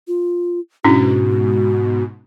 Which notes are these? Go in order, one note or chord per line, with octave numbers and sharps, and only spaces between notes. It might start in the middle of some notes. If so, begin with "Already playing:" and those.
F4
G#2 B2 C#4 D4 E4 F#4